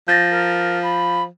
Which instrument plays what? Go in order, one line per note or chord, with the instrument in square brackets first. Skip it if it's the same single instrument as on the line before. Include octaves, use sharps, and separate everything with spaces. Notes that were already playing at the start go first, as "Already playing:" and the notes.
[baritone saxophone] F3 [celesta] G6 A6 A#6
[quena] A#4
B5